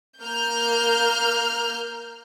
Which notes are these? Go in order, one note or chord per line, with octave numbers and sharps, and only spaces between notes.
A#3 F6 G6